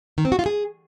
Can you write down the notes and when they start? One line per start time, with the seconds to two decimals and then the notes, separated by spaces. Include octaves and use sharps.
0.18 D#3
0.25 C4
0.32 F#4
0.39 F4
0.46 G#4